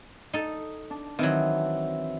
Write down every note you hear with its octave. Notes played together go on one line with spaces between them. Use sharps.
D#4 A4
D4
D#3 E3 F#3 C4